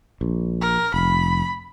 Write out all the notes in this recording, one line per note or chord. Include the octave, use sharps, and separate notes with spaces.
A#1
A#4
F1 B5